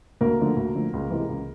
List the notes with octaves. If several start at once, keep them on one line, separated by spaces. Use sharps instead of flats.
D2 A#3 A#4
D3 F3 A3
D2
D3 F3 A3
C#2
C3 E3 G#3
C#2